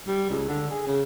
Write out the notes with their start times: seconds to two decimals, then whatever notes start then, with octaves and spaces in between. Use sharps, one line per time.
0.07 G3
0.30 C#2
0.48 D3
0.71 G#4
0.87 C#3